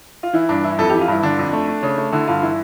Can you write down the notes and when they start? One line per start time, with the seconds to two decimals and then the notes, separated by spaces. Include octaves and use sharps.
0.23 F4
0.33 E3 E4
0.49 G2 D4
0.64 E3 E4
0.78 F2 A4
0.89 E3 G4
1.01 F4
1.08 G2 E4
1.23 D3 D4
1.38 F2
1.53 A3
1.68 A3
1.83 C#3
1.98 A3
2.12 D3 E4
2.27 G2 F4
2.42 E3 E4